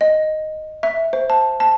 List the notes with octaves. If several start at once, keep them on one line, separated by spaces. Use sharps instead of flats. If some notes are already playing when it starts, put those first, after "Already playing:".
D#5
E5
C5
A5
A5